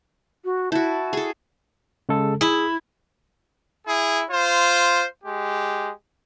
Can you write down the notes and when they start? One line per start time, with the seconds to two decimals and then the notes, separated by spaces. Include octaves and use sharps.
0.45 F#4
0.72 E4 F#4 A5
1.13 G#4 A4
2.09 C#3 G#3 A4
2.41 E4 G#4
3.87 E4 G#4
4.30 F4 C5
5.24 G#3 G4